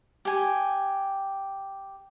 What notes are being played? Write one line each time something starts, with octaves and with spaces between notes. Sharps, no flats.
G4 G#5